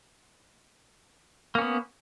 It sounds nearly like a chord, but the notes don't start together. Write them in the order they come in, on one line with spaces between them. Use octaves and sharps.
A#3 C#4 B3